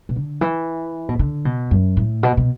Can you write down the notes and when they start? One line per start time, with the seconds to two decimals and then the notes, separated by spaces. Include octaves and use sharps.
0.09 B2
0.16 D3
0.41 E3
1.09 B2
1.19 D3
1.45 B2
1.71 F#2
1.97 A2
2.23 B2
2.37 B2